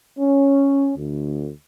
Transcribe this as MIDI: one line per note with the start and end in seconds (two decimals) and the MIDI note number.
0.19 0.91 61
0.97 1.50 38